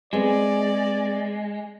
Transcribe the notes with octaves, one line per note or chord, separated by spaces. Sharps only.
G#3 B3 C4 G#4 D5